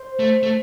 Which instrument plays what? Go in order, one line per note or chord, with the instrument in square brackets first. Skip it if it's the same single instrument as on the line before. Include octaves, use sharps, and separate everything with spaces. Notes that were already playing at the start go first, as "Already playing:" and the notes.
Already playing: [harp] C5
[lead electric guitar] A3
A3